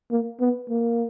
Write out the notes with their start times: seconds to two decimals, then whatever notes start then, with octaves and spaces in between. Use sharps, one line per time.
0.11 A#3
0.41 B3
0.70 A#3